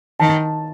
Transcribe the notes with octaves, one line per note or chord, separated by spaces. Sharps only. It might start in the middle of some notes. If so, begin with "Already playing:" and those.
D#3 A5